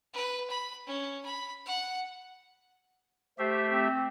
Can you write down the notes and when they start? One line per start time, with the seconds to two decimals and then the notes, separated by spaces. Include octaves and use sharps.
0.13 B4
0.50 B5
0.87 C#4
1.25 B5
1.66 F#5
3.39 A3 G4 C5 E5
3.70 C4